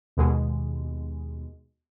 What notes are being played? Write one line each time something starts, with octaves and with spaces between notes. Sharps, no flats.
D#2 B2 G#3